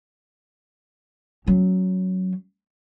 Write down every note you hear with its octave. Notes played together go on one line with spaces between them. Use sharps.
F#3 C#4